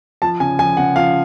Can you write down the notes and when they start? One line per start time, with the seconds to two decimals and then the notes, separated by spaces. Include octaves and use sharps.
0.22 F3 A5
0.40 C#3 G#5
0.59 F3 G#5
0.77 C#3 F#5
0.96 F3 F5